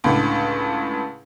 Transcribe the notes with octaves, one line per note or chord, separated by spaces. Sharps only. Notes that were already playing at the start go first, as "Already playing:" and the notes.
C#2 A2 D3